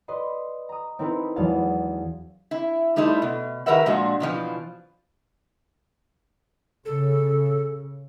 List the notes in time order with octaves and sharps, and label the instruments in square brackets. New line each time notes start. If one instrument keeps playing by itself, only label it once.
[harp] B4 D5 D#5 C6
A#5 D#6
C4 D#4 E4 A#4 B4
E2 F#3 G#3 D4 F5 A5
[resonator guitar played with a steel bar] E4
G3 A3 D#4 E4 C5
B2
D#3 G4 A#4 B4 E5 F#5
A#2 F3 G#3 D4 F#4
B2 E3 F3
[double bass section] C#3 [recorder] A4